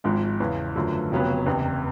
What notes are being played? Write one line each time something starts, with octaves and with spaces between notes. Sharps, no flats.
G#1 G#2 F3 G#3
E2 C#3 E3
F#2 D3 F3 A3
F1 F2 C#3 F#3 B3
F#1 E2 C3